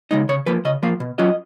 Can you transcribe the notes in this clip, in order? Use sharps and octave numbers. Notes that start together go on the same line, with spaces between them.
C#3 G#3 D#4 D#5
C#3 C#5
F3 A#3 B4
C#3 D#5
F3 A#3 F5
B2
F#3 C#4 F4 D#5